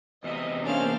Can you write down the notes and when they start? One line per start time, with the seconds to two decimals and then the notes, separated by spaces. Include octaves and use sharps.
0.24 E2 C3 D#5 E5
0.63 A#3 C#4 D4 C5 F5 F6